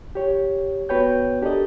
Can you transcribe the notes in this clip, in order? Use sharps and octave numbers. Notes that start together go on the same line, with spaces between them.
G4 C#5
B3 F#4 B4 C#5 G5 G6
D4 G4 A4 A#4 D5 D#5